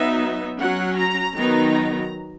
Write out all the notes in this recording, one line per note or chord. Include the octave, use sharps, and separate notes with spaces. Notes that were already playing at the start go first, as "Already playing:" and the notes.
Already playing: F#3 B3 D#4 E5
F#3 C#4 F#5
A#5
D#3 F#3 B3 D#4 A#5